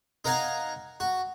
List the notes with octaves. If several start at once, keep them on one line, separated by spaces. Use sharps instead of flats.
D#4 A#4 F5 F#5 G#5 A#5
F#4